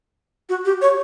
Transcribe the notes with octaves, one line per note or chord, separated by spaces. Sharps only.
F#4
G4
C#5